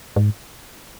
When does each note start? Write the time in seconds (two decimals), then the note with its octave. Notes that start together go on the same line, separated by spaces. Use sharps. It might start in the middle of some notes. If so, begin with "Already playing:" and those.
0.16 G#2